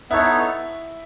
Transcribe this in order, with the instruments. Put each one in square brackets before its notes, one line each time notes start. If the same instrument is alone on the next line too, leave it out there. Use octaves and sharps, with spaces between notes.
[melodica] B3 D#4 A4 C#5 [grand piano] E4